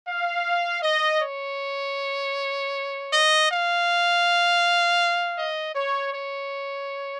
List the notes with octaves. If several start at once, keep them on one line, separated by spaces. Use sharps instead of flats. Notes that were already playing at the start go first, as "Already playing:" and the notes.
F5
D#5
C#5
D#5
F5
D#5
C#5
C#5